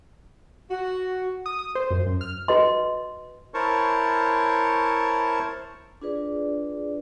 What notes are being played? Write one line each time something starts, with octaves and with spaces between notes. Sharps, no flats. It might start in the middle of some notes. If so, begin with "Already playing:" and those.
F#4
D#6
D#6
C5
F#2
F#2
F6
F#4 B4 D#5 C6
E4 A#4 C5 C#5 A5 C#6
D4 F4 G#4 B4 D5